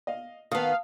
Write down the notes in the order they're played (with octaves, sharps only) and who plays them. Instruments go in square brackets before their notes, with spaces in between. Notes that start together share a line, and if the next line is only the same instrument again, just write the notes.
[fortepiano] D#5 F5
[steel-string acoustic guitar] D#3 B3 [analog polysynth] F5 [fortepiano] A5 D#6